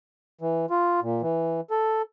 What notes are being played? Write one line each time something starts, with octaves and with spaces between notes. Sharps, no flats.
E3
F4
A#2
E3
A4